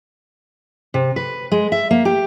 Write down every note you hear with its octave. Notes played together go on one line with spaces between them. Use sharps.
C3
B4
G#3
E5
A#3
G4